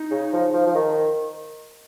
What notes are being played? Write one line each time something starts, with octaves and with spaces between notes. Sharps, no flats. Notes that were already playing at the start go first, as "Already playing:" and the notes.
Already playing: D#4
C#3
F3
F3
F3
D#3